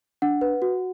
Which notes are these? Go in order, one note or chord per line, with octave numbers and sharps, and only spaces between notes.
D4 F#5
B4
F#4